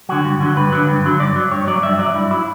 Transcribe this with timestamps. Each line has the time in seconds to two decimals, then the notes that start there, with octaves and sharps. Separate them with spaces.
0.09 D3 F#3 F#4
0.25 G2
0.40 D3 F#3
0.56 G2 B4
0.72 D3 F#3
0.88 G2
1.04 D3 F#3
1.20 G2 D5
1.36 F#3
1.51 G2 C#5
1.67 F#3 D5
1.83 G2 E5
1.99 F#3 D5
2.14 G2 E4
2.31 F#3 E4